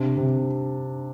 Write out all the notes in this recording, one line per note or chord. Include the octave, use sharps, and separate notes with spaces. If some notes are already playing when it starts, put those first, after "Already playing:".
Already playing: C3 D4
C3